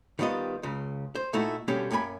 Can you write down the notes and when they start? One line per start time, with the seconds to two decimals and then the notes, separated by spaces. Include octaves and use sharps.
0.19 D#3 G3 B3 F4 D#5
0.63 C#2 C#3
1.15 C5
1.33 A#2 A3 D#4 E4 F#4
1.68 B2 D3 G3 A#3 C#4 G4
1.91 F#2 A#3 G5 G#5 B5